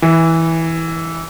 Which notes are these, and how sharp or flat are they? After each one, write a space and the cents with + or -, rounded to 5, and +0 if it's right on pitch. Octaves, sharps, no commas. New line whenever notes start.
E3 -10